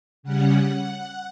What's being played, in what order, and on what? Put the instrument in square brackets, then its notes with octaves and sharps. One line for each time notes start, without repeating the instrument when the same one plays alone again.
[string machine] C#3 G3 C#4 F#5